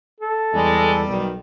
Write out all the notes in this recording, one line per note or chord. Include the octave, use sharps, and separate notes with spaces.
A4
E2 G3 G#3
B1 D#3